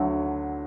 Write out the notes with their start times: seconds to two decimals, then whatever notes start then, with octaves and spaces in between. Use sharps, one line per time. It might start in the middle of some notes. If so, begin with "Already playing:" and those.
Already playing: D2 D3 F#3